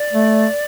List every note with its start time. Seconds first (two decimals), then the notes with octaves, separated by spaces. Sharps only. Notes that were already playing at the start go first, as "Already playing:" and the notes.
Already playing: D5
0.13 A3